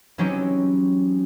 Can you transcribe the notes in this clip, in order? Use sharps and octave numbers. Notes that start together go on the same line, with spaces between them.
E3 F#3 C4 C#4 D#4 G4